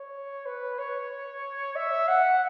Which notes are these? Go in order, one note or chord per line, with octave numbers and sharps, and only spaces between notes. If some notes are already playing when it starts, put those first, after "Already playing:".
Already playing: C#5
B4
C#5
E5
F#5